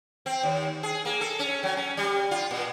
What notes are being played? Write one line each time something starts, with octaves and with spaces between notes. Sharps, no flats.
C4
D#2
G#4
A#3
A4
C#4
F#3
C#4
G3
F4
A#2